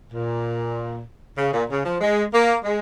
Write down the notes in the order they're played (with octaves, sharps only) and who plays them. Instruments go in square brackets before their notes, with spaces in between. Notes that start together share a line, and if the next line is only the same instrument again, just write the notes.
[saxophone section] A#2
C#3
A#2
C#3
F3
G#3
A#3
G#3